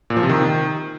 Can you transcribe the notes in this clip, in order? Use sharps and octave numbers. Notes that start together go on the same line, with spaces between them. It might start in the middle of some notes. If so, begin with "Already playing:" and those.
A#2
F3
C3
D#3